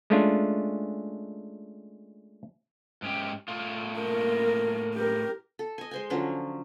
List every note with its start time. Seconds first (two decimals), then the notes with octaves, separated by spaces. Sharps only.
0.10 G#3 A3 C#4 D4 F4
3.02 G#2 C#4 G4
3.48 A2 F4
4.00 A#3 A#4
4.94 G4 A#4
5.59 A4
5.78 D#5 G#5
5.91 G#3 C5 G#5
6.10 D3 F3 F#3 C#4